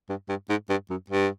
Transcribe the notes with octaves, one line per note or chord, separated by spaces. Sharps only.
G2
G2
G#2
G2
F#2
G2